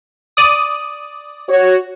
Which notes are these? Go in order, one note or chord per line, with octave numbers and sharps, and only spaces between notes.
D5 D#6
F#4 C#5